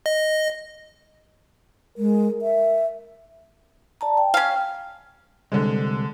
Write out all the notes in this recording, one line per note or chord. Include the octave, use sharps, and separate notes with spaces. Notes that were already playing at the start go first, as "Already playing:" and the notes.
D#5
G#3 A#4
E5
D5 A5 A#5
G5
C#4 F5
C2 D3 G#3